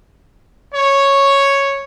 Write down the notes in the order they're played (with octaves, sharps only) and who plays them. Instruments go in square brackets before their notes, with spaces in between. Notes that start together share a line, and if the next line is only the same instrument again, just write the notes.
[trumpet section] C#5